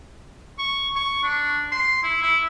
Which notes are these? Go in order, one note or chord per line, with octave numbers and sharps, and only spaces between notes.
C#6
C#6
D4
C6
E4
E4